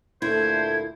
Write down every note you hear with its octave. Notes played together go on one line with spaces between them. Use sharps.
D2 A#2 A3 E4 C5 G#6